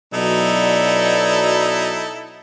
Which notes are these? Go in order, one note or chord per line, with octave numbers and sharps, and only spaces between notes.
B2 F#3 D#4 E4 A4 D5